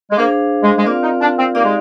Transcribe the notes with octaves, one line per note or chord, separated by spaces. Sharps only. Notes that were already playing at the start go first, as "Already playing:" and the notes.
G#3
A#3 D4 G#4 C5 F5
G#3
G#3
A#3 C4 F4 A#4 D5 F5
D#4
D4
C4
A#3 D#4 G4 D5 F5
G#3